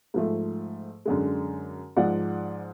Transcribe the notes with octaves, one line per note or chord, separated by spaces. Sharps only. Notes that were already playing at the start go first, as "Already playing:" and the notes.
G#2 F3 A3
F#2 D3 G#3
G#2 F3 G#3 D5 F#5